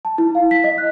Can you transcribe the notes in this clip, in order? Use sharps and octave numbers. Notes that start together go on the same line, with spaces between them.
A5
E4
F5
B6
D#5
F#6